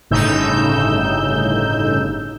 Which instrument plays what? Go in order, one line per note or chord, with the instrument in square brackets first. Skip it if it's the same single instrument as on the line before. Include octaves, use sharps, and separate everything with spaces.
[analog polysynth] G1 A2 C#3 D#4 E6 G6